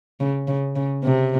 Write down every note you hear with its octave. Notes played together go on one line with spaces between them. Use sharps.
C#3
C#3
C#3
C3